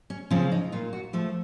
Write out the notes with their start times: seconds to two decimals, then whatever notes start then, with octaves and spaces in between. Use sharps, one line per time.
0.10 C#4
0.30 C#3 F3 C4 C#4
0.52 D#4
0.72 A#2 F4
0.93 F#4
1.13 F3 A3 A4